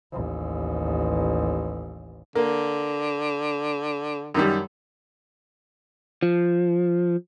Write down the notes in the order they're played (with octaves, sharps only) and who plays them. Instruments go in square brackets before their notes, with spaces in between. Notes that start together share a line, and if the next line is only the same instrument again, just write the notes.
[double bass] A1 D#2
[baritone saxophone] D3 [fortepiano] A#3
[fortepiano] F#2 D#3 G3
[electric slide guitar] F3